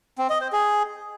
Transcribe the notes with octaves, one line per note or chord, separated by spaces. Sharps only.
C4
D#5
C5
G#4